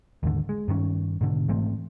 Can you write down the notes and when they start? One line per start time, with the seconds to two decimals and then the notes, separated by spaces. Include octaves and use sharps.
0.23 D#2 G#2 D3
0.49 G#3
0.68 G2 D#3 B3 C#4
1.21 G#2 B2 D3
1.48 G#2 E3 A3 C4